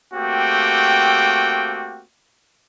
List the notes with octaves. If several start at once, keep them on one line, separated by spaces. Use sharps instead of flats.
A3 A#3 C4 F#4 G4 G5